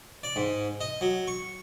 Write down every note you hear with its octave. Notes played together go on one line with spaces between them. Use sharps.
D5
G#2
D#5
F#3
C#6